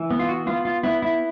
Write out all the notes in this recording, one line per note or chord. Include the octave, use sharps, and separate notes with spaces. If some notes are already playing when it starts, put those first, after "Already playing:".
Already playing: E3
B3
F4
F#4
B3 F4
F4
B3 E4
E4